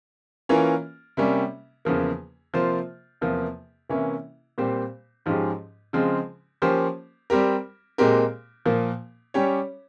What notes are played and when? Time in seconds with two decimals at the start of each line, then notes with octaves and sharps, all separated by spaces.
0.49 E3 A#3 C#4 F4 A#4
1.17 C3 G3 A#3 C#4
1.85 E2 C#3 F3 A#3
2.54 C3 F3 A#3 F4 C5
3.21 E2 C3 F3 A#3
3.89 C3 E3 A#3 C#4 E4
4.58 A#2 G3 C4 G4 C5
5.26 G#2 F3 G#3 C#4 G4
5.93 C#3 F3 G#3 C4
6.62 F3 A#3 C#4 G4 C5
7.30 G3 C4 G4 A#4
7.98 A#2 G#3 C4 G4 A#4
8.65 A#2 F3 A#3
9.34 G3 C#4 G4 C#5